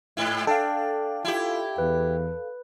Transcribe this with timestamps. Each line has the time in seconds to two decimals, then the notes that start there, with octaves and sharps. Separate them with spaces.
0.17 G#2 E4
0.47 D4 A4 F5 G5
1.25 E4 F4 G4
1.78 E2 B4